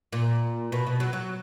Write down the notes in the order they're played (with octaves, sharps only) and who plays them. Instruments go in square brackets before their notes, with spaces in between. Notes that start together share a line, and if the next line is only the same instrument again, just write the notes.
[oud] A#2
B2
B2
F#3
F#3